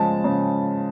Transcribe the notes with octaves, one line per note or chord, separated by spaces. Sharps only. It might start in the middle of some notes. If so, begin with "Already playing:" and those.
Already playing: C#3 F3 G#3 A5
C#3